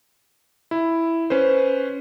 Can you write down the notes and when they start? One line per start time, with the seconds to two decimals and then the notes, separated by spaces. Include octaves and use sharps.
0.71 E4
1.30 C#4 B4 C5